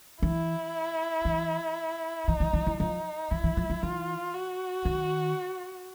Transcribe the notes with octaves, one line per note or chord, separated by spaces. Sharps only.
E3 E4
E3
E3 D#4
E3
E3
E3
F3 D#4
E3 E4
E3
F3
F3
E3 F4
F#4
D#3